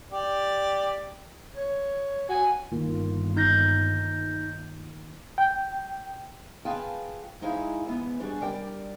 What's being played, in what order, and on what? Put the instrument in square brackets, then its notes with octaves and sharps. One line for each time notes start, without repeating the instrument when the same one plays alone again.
[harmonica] G4 D5
[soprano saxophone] C#5
[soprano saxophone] F#4 [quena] G#5
[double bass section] G1 [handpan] D#3 A#3 F4
[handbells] D#4 G6 A#6
[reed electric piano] G5
[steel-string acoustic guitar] F4 G#4 B4 F5 G5 A5
G#2 D#4 E4 G#4 E5 F5
E2 G#2 B3
G3 D4 F#4 G#4
G3 A#4 D5 G5